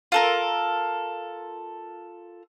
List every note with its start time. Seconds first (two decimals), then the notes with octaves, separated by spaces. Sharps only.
0.12 F4 A4 A#4